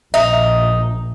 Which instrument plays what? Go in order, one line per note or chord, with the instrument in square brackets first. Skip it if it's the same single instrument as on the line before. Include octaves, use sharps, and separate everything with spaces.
[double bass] A#1 [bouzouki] D#4 [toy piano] E5